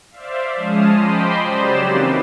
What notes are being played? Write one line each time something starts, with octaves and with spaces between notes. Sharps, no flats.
C5 D5 E5 F5
F3 G#3 C#4 A5 D#6 F6
C5 D#5 G5 B5 C6 D6
C#3 F#3 G4 C5 D5 E7
E3 A#3 C4 D#4 B4